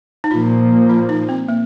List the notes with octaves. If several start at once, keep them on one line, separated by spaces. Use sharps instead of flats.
D#4
A#2 F3 A#3 F4
F4
D#4
C4
A#3